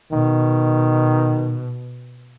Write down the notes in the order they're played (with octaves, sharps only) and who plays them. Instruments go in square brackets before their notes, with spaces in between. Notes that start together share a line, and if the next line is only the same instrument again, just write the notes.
[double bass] B2 [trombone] D#3